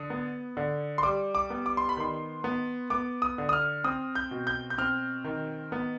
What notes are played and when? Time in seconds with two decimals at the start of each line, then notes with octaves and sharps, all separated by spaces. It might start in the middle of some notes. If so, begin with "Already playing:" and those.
Already playing: D3 D#6
0.10 B3
0.57 D3
0.98 C6
1.03 G3 D6
1.35 D6
1.50 B3
1.66 D6
1.77 C6
1.89 B5
1.97 D#3 C6
2.44 B3
2.90 B3 D6
3.22 D#6
3.38 D3
3.49 D#6
3.53 F6
3.84 C4 D#6
4.15 G6
4.31 B2
4.47 G6
4.70 G6
4.78 C4 F6
5.24 D#3
5.72 B3